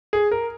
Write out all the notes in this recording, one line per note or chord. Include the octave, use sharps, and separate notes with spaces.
G#4
A#4